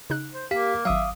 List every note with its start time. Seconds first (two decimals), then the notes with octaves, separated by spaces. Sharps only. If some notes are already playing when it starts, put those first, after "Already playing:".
0.10 C#3 D#4 F#6
0.33 C5
0.51 A#3 G4 F5 B6
0.85 G#1 F#3 E5 F5 D6 D#6